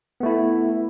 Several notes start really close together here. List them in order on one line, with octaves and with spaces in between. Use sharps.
B3 A3 E4